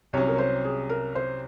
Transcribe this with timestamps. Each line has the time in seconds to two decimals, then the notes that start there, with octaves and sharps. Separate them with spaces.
0.13 C2 C3 F#3 C#4 C#5
0.28 A#4
0.38 C5
0.64 G#4
0.89 A#4
1.15 C5